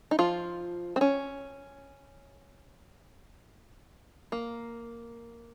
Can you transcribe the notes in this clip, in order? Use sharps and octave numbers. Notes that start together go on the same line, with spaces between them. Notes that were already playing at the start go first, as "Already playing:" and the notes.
D#4
F3 F4
C4
C#4
A#3